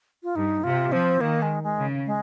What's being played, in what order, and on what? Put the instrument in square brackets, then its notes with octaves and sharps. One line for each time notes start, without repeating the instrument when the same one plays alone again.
[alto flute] F4
[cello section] G2 [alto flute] D#4
[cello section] C3 [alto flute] F4
[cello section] F3 [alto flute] C4
[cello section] D#3 [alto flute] A#3
[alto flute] G#3
G#3
[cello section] C#3
[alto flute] G#3